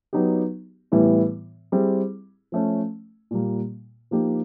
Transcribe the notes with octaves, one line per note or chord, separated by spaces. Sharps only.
F#3 B3 D#4 G4
A2 E3 G3 B3 E4
G3 C4 E4 G#4
F3 A3 C#4
A#2 G3 A#3
F3 A#3 D#4 G4